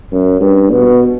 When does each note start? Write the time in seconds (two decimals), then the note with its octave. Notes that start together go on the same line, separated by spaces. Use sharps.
0.12 F#2
0.41 G2
0.71 B2